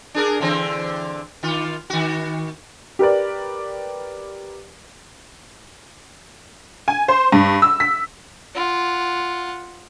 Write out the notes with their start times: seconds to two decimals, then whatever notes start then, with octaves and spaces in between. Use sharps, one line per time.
0.14 D4 G#4 A#4
0.40 D3 E3 C4
1.43 D#3 F4
1.90 D#3 F#4
2.99 G4 A#4 B4 D5
6.88 G#5
7.08 C5
7.32 G2
7.62 E6
7.80 B6
8.55 F4 F#5